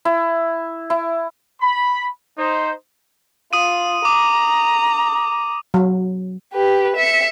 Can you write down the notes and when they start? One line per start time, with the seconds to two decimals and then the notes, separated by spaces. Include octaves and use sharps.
0.05 E4
0.90 E4
1.61 B5
2.38 D#4 C5
3.53 F4 D#6 D#7
4.05 A#5 D6
5.74 F#3
6.53 G4 B4
6.96 E5 C#7